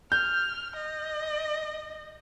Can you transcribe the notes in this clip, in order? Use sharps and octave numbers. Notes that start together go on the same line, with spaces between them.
F6 G6
D#5